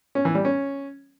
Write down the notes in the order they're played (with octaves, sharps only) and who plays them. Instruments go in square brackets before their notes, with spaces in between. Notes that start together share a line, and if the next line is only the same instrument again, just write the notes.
[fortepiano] C#4
E3
G3
C#4